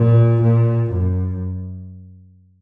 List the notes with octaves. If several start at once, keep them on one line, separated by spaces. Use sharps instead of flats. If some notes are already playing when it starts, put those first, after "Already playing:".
Already playing: A#2
A#2
F#2